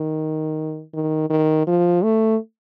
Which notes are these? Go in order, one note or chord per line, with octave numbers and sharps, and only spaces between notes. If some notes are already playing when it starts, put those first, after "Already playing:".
Already playing: D#3
D#3
D#3
F3
A3